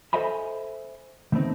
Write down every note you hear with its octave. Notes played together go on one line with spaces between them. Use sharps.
A4 C5 D#5 E5 G#5 B5
D#3 A3 B3 C4 D#4